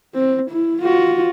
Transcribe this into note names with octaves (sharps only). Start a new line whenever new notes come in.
C4
E4
F4 F#4